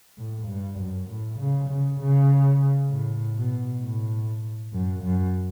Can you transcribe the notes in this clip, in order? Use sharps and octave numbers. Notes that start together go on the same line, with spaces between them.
A2
G2
F#2
A2
C#3
C#3
C#3
A2
B2
A2
F#2
F#2